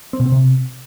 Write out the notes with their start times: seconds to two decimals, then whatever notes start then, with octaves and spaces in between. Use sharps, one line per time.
0.13 C4
0.20 B2
0.26 C4
0.32 C3